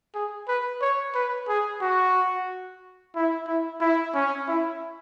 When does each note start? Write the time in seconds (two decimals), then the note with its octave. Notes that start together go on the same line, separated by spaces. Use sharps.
0.15 G#4
0.48 B4
0.81 C#5
1.15 B4
1.48 G#4
1.82 F#4
3.16 E4
3.48 E4
3.81 E4
4.15 C#4
4.48 E4